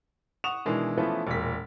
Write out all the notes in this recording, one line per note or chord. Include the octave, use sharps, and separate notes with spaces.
F#5 C#6 D#6 E7 F7
B2 D#3 E3 G#3 D4
E3 F3 A3 B3 C#4 B4
E1 A#2 B6